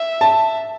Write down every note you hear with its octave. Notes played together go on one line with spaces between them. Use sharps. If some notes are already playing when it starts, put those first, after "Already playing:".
Already playing: E5
A5